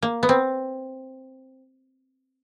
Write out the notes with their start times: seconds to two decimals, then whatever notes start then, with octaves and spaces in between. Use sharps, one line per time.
0.03 A#3
0.23 B3
0.29 C4